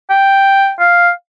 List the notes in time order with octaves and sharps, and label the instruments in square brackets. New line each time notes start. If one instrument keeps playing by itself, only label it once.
[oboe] G5
F5